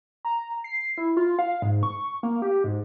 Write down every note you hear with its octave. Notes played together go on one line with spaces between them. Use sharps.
A#5
C7
E4
F4
F5
G#2
C#6
A#3
G4
G#2